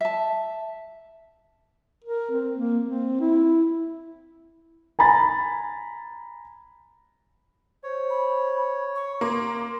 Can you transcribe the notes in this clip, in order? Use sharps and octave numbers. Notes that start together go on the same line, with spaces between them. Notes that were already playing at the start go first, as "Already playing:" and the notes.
E5 A5
A#4
C4
A#3
C4
E4
G#5 A#5 B5 A6
C5 C#5
B5
C#6
A#3 C6 D6